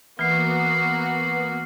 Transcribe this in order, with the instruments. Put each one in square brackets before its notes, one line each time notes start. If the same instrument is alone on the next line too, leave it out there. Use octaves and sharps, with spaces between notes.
[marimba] E3 [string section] A#3 F#4 [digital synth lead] B3 [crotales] F6 C7